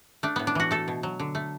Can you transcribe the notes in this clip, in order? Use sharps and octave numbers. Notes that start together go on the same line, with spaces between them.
A3 D4
A2 B3
D4
E3 F#4
A3 A4
B2
F#3
D3
A3